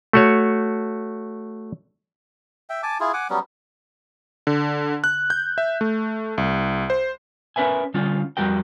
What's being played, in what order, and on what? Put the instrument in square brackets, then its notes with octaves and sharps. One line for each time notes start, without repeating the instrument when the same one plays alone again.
[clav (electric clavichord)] A3 F#4 C#5
[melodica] E5 G5
G#5 A5 D6
E4 F4 G#4
F#5 G#5 D6
F#3 G3 B3 C#4
[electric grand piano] D3
F#6
G6
E5
A3
C2
C5
[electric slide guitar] C#4 A#4 B4 E5 G#5
D3 G3 C#4 F4
F2 G3 F#4 A#4 G5